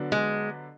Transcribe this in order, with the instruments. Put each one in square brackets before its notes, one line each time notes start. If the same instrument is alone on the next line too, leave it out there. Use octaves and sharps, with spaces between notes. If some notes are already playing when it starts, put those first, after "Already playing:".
Already playing: [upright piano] D3 F#3 B3 D4
[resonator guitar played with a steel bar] G#3